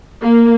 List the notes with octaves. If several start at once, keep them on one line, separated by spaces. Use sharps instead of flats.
A#3